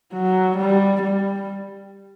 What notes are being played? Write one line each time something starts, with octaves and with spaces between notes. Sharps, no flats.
F#3
G3
G3